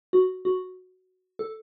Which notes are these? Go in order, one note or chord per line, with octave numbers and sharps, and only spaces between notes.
F#4
F#4
A4